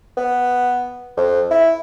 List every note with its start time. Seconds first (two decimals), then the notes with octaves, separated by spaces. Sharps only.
0.17 B3
1.17 F2
1.51 E4